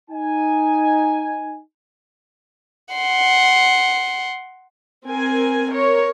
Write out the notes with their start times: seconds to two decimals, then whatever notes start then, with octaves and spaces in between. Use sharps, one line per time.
0.10 D#4 G#5
2.94 F#5 C6
5.06 C4 A#4 G#5
5.69 A#4 C#5